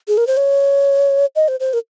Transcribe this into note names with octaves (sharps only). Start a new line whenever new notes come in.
G#4
A#4
C5
C#5
D#5
C5
C5
A#4